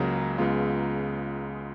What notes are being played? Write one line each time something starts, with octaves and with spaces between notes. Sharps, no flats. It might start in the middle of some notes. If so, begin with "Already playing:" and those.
Already playing: C#2 C#3 F#3 A#3 A#5
C#2 C#3 G#3 B3 F4